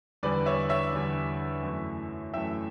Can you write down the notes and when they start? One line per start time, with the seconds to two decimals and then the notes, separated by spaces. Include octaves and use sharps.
0.23 E2 D3 G3 B4 D5
0.46 C#5 E5
0.69 C#5 E5
0.93 E2 D3 G3
1.63 F#2 E3 A3
2.33 F#2 E3 A3 E5 G5